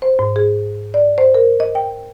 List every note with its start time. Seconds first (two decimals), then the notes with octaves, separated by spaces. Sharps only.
0.02 C5
0.19 G#2
0.36 G#4
0.94 D5
1.18 C5
1.35 A#4
1.60 D#5
1.75 G5